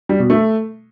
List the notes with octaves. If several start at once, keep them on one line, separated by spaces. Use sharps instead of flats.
G3
B2
A3